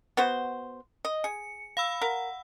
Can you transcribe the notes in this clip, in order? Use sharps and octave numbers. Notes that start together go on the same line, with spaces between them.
B3 F#4 C5
D#5
G#4 C#7
F5 B5 E6
A#4 F#5